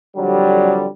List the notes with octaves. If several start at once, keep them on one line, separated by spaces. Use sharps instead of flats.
F2 D3 F#3 G3